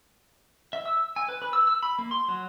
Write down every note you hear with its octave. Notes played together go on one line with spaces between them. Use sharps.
E5
E6
G#5
B4
B4
E6
E6
B5
A#3
C6
F#3